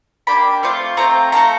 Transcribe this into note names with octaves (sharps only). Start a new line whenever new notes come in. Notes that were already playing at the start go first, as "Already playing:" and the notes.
A#3 D4 G4 B5
A3 C4 F4
A3 C4 F4 A#5
A3 D4 F4 A4 A#5